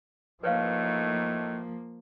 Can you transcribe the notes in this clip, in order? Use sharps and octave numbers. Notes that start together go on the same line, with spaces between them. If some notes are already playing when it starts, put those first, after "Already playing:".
A2 F3 A3 A#3 D#4 B4 C#5 F5